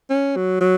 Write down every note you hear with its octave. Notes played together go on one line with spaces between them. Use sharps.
C#4
F#3
F#3